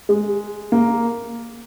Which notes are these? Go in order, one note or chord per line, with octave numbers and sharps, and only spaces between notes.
G#3
A#3